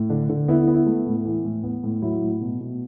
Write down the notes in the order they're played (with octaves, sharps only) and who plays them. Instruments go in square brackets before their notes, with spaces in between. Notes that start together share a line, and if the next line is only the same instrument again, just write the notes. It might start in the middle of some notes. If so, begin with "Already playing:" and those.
Already playing: [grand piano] A2
D3 D4
D3
B3 E4
E4
B3
E4
A3
A2
E3
A2
B3
A2
F#3 E4
A2
B2
B2